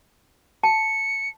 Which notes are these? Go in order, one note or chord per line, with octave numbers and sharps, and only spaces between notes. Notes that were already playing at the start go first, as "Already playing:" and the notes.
A5 C#7